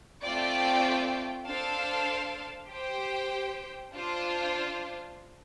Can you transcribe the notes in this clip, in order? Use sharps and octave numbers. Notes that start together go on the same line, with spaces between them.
A3 C4 F4 D5 G5
D4 A4 C5 F5 A5
G4 C5 G5
D4 F4 C5